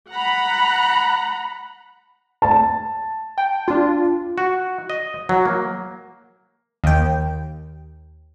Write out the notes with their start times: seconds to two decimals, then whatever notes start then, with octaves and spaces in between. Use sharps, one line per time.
0.11 F#5 A#5 B5
2.42 A5
3.38 G5
3.68 D4 F4
4.38 F#4
4.90 D#5
5.29 F#3
5.46 A#3
6.84 D#2 G5